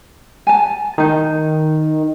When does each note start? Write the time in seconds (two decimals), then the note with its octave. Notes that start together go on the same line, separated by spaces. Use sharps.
0.47 G#5 A5
0.98 D#3 D#4 A5